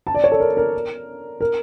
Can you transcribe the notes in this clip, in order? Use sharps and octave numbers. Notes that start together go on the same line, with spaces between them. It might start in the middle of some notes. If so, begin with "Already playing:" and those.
A5
D5
C#5
A4
A#4
A#4
A#4